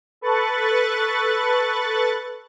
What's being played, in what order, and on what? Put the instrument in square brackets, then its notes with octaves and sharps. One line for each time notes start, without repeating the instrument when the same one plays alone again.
[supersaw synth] A4 B4 C#6 F#6 A6